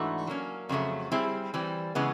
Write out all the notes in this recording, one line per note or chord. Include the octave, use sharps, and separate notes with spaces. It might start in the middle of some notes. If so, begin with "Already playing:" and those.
Already playing: G#2 E3 A3 D4 F#4
F#3 A#3 C#4
F2 C#3 F#3 A3
G3 C4 E4 G#4
E3 G3 C4
C#3 E3 G#3 B3